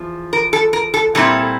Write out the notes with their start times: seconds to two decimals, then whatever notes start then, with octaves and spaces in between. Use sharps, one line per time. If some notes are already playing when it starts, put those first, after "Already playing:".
Already playing: E2 F3
0.33 A#4
0.53 A4
0.73 A#4
0.94 A4
1.15 A#2 G3 C4 E4 A4